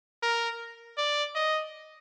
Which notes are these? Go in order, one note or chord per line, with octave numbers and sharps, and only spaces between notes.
A#4
D5
D#5